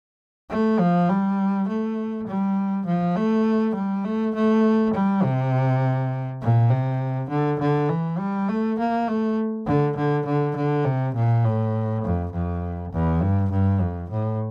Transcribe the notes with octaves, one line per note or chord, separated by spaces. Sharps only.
A3
F3
G3
A3
G3
F3
A3
G3
A3
A3
G3
C3
A#2
C3
D3
D3
E3
G3
A3
A#3
A3
D3
D3
D3
D3
C3
A#2
A2
F2
F2
E2
G2
G2
F2
A2